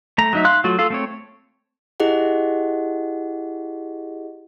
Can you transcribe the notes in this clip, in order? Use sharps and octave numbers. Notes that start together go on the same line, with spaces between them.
A3 A#5
F#3 D#4 E5
F5 C6 F#6
F#3 A3 F4 F#4
F4 A4 F5
A3 C4 C#5
E4 G4 G#4 D#5 F#5